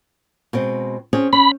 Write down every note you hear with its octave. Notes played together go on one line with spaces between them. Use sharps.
B2 G#3 C4
C4 C#4 G#4
C#4 B5